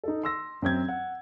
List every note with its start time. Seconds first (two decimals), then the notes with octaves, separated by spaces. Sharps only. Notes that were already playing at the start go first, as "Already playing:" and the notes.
0.04 D#4 A4
0.23 C6 E6 A#6
0.62 F#2 C4 G6 G#6
0.89 F#5